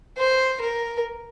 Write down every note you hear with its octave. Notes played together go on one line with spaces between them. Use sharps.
C5
A#4